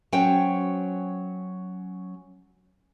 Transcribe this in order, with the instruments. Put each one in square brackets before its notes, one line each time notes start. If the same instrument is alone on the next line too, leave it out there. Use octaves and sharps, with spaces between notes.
[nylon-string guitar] F#3 C#4 C5 G5